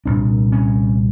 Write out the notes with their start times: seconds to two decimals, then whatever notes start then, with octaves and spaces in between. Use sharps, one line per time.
0.05 C2 A#2 D4
0.52 C#4